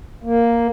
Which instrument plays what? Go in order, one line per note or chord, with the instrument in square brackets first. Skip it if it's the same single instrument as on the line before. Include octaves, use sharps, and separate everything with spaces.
[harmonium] A#3